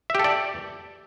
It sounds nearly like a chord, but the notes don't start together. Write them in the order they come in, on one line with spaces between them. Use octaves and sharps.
E5 G4 A4 D5